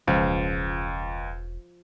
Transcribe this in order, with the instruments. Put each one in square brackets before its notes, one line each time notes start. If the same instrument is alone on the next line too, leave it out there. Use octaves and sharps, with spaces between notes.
[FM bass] E1 [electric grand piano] C#2 [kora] F3